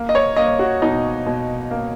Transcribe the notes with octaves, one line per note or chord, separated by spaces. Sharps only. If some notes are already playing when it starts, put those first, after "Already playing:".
Already playing: A#3
D#5
C#5
A#3 D#5
F#4
B2 D#4
B2
A#3